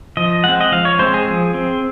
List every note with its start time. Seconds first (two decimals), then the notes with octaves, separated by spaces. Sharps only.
0.17 F3 D#5
0.44 G#3 C4 F#5
0.61 D#5
0.72 F3 F5
0.85 C#5
0.99 G#3 C4 C5
1.14 G#4
1.27 F3
1.54 C4